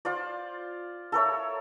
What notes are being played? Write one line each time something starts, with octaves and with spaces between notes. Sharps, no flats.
F4 C5 D5
A4 A#4 C#5 E5